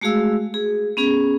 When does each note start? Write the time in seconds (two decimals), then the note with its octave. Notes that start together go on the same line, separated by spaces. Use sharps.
0.01 G#3 A3 F#4 G#4 F5 E6
0.54 G#4
0.97 B3 C#4 G#4